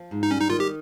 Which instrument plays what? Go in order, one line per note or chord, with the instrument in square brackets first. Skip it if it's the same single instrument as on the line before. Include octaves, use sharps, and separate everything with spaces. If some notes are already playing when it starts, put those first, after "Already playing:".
Already playing: [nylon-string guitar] F3
G#2
[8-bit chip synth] D#4
[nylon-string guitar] G3 [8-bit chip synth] C#4
[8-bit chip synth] D#4
[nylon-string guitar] D#3 [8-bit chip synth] F4
[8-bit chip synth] G4